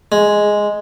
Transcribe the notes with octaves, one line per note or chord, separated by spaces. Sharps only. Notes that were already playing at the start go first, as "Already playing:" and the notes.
G#3